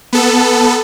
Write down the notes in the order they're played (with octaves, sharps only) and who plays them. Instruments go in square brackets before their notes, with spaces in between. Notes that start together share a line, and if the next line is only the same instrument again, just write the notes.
[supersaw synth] B3 A4